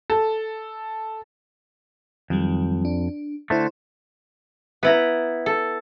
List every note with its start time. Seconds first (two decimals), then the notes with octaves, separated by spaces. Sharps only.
0.10 A4
2.30 F2 D#3 F#3 G3
2.85 D4
3.50 D3 A3 E4 C5 C6
4.83 B3 E4 A#5
5.46 A4